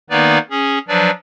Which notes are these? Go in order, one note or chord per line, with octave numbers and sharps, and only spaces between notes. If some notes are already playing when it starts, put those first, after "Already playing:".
D#3 A#3 B3 D#4 B4 D5
C#4 G#4
F3 F#3 D4 B4 D5